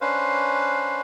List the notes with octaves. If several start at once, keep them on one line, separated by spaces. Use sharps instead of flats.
C#4 D4 B4 C5 F5